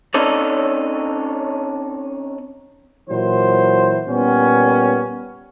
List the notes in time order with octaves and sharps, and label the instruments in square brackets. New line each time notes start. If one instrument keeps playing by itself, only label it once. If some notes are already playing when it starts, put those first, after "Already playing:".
[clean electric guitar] C4 C#4 D#4 A4 C#5 D5
[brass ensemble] A#2 E3 F#3 C5
A#2 G3 B3 C#4